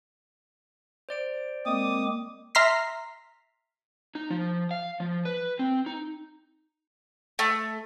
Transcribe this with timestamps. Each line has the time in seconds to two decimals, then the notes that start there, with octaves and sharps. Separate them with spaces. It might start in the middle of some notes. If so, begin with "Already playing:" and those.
1.09 C5 D5 D7
1.66 G#3 A#3 C4 D6 D#6
2.55 E5 A#5 C6 F6 B6 C7
4.15 D#4
4.30 F3
4.71 F5
5.00 F3
5.25 B4
5.59 C4
5.86 D#4
7.39 A3